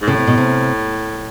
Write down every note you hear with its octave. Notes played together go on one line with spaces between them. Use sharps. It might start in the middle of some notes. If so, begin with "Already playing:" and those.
G#2
A2 C#3
C3
B2
C3